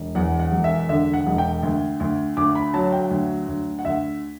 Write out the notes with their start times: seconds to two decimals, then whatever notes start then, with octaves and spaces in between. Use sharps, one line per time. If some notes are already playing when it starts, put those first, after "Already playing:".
Already playing: E1
0.15 E2 F#5
0.40 F#5
0.52 E1
0.64 E5
0.89 D3 E5
1.13 F#5
1.26 E1
1.38 G5
1.63 D2
2.00 D2
2.37 D2 D6
2.55 B5
2.74 F#3 A5
2.92 G5
3.11 D2
3.48 D2
3.79 F#5
3.85 D2 E5